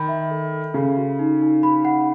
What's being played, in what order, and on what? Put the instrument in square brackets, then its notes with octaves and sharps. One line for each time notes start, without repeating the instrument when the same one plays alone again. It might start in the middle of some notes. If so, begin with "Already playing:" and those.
Already playing: [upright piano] D#3 [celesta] B5
[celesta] E5
A4
A4
[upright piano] C#3 [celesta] A4
[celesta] F#4
D#4
D#4
B5
F#5